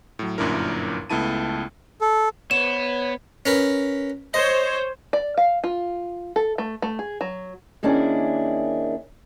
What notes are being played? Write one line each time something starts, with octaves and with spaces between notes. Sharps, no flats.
A2 F#3
G1 F#2 A#2 D4 E4 A#4
C#2 A3 B3 E4 A5 D#7
A4
B3 C5 C#5 E7
C#4 A#4 B4
C5 C#5 D#5
D5
F5
F4
A4
A3
A3
G#4
F#3
D#3 A#3 C#4 D4 E4 G#4